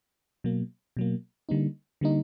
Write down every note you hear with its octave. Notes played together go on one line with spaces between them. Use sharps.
B2 F#3 A#3
B2 F#3 A#3
D3 G3 A#3 D#4
D3 G3 A#3 D#4